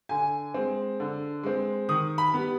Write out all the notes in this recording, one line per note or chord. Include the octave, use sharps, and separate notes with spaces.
D3 G#5
G#3 C4
D3
G#3 C4
D#3 D#6
B5
G3 B3